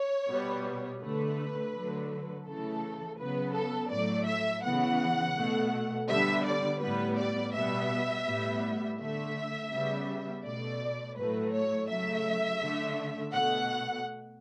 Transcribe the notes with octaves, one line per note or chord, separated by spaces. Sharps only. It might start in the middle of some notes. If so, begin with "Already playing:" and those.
Already playing: C#5
B2 G3 B3
D3 A3 B4
D3 F#3 A3
C#3 E3 A3 A4
C#3 F#3 B3 B4
A4
A2 F#3 A3 D5
E5
C#3 E3 B3 F#5
B2 A3
D3 G3 B3 E5
D5
A2 G3 B3 B4
D5
B2 G3 B3 E5
A2 G3 B3
D3 A3 E5
C#3 G3 B3
B2 A3 D5
A2 F#3 A3 B4
C#5
C#3 F#3 A3 E5
D3 A3
B2 A3 F#5